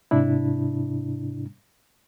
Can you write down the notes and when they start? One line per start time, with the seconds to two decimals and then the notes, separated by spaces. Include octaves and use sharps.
0.11 G#2 C3 D4 E4